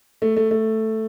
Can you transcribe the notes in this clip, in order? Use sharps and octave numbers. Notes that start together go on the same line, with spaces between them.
A3
A3
A3